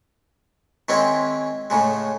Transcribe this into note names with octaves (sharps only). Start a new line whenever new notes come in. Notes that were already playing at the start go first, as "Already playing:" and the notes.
D#3 G#3 C4 C#4 E4
A2 C#3 G#3